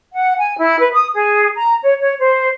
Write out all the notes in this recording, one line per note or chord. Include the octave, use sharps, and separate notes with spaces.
F#5
G#5
E4
B4
D#6
G#4
A#5
C#5
C#5
C5